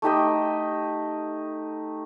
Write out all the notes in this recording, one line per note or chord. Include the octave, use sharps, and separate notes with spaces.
A3 D#4 G4 D#5